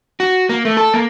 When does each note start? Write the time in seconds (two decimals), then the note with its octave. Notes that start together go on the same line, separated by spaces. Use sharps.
0.20 F#4
0.49 A#3
0.65 A3
0.77 A4
0.94 A#3